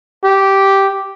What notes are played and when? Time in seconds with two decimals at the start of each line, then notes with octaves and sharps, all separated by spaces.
0.24 G4